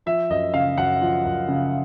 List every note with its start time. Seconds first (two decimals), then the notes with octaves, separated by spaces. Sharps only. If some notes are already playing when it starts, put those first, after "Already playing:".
0.06 F3 E5
0.30 F#2 D#5
0.54 C#3 F5
0.78 F#2 F#5
1.01 F3
1.25 F#2
1.48 C#3